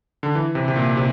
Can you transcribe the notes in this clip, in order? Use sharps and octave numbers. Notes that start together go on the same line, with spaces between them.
D3
E3
C3
C3
A#2
C3